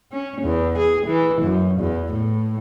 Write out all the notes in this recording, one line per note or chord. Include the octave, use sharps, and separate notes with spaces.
C#4
E2
G#4
E3
F#2
E2
A2